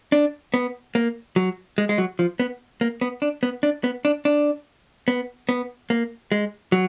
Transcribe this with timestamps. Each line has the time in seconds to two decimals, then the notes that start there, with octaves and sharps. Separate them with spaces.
0.12 D4
0.54 B3
0.95 A#3
1.36 F#3
1.78 G#3
1.89 G#3
1.98 F#3
2.19 F3
2.40 B3
2.81 A#3
3.01 B3
3.22 D4
3.43 B3
3.63 D4
3.84 B3
4.05 D4
4.25 D4
5.08 B3
5.49 B3
5.90 A#3
6.32 G#3
6.72 F#3